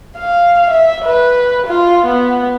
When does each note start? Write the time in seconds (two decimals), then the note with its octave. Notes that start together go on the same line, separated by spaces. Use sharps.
0.18 F5
0.71 E5
1.05 B4
1.67 F4
2.06 B3